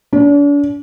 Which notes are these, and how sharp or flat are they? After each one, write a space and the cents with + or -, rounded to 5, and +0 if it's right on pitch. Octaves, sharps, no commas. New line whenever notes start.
D4 -40